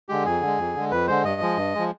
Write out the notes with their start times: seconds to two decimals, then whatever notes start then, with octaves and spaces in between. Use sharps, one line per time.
0.09 D3 G#3 G4
0.26 F2 G#4
0.42 D3 G#3
0.59 F2
0.75 D3 G#3
0.91 F2 B4
1.08 D3 G#3 C5
1.24 G2 D#5
1.41 F3 G#3
1.57 G2
1.75 F3 G#3